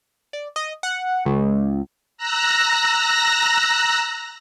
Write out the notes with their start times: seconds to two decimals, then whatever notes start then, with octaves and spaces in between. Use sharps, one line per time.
0.33 D5
0.56 D#5
0.83 F#5
1.25 C#2
2.18 A#5 E6 F#6 A#6